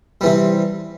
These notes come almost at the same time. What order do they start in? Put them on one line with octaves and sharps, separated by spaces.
G3 E3 C3